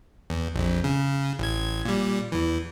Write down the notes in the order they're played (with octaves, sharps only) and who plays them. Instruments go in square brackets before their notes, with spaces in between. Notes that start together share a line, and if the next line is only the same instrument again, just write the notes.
[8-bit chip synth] E2
A#1 F2
C#3
A1 G#6
A#2 G3
E2 E3